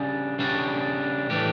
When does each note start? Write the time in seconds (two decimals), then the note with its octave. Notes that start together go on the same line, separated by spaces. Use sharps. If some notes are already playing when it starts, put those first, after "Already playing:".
Already playing: C#3 G3 D4
0.39 C#3 G3 D4
1.30 A2 E3 A3 D4 G4